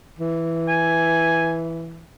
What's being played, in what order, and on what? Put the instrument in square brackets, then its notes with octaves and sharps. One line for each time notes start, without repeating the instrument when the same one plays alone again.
[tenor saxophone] E3
[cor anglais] G#5